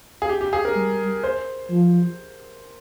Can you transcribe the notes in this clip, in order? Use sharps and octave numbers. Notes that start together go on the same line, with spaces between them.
G#4
G4
G4
G#4
A#4
G3
C5
F3